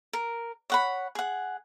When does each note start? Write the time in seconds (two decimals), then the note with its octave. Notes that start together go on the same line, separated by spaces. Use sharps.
0.13 A#4
0.70 C#5 F#5 B5
1.15 G#4 F#5